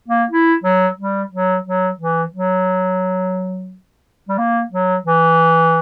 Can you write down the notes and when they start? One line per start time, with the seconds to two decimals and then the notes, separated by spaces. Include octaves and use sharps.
0.08 A#3
0.30 E4
0.64 F#3
0.99 G3
1.33 F#3
1.66 F#3
2.00 E3
2.34 F#3
4.29 G3
4.38 A#3
4.72 F#3
5.06 E3